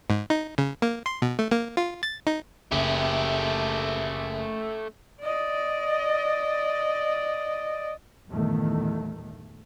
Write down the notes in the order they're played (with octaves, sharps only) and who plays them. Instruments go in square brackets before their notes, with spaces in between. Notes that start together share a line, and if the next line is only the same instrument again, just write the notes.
[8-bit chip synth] G#2
D#4
C#3
A#3
C6
B2
A3
A#3
F4
A6
D#4
[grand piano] F#1 [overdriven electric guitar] A3 G4
[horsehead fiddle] D5 D#5
[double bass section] E2 G2 A#2 D#3 A3